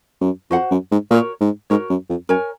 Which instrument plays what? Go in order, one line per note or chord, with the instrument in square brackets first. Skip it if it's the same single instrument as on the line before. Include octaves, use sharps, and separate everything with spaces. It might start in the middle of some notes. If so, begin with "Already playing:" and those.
[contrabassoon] F#2
[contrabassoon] F2 [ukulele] F#4 C5 F#5
[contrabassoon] F#2
G#2
[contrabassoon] A#2 [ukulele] F#4 A#4 C#5
[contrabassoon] G#2
[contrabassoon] G#2 [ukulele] F#4 A#4 C#5
[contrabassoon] F#2
F2
[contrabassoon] F#2 [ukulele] A#4 C#5 G#5